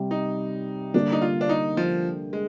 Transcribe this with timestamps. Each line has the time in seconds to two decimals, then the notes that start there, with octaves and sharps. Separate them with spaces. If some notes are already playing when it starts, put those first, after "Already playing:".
Already playing: C3 G3
0.11 D#4
0.94 D3 G3 A#3 D4
1.12 D#4
1.22 F4
1.41 D4
1.49 D#4
1.77 F3
2.33 G#3